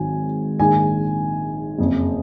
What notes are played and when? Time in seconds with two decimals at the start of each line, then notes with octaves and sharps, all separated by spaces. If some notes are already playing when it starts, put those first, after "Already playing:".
Already playing: G#1 G#2 D#3 F#3 G#5
0.59 A#1 G#2 D#3 G#5
1.78 F#1 F2 C#3